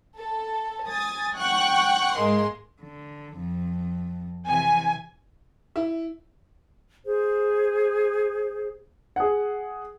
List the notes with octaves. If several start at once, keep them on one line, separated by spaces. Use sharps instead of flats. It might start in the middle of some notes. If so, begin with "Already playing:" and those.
A4
G#5 D#6 A6
F#5 G5 C#6 F#6
G#2 G#3 A#3 C6
D3
F2
C3 E3 G#5
E4
G#4 C5
G#4 F#5